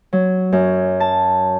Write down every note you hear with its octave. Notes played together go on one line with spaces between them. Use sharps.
F#3
F#2
A5